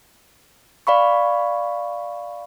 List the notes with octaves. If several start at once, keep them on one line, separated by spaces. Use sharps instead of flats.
D5 F5 B5 C#6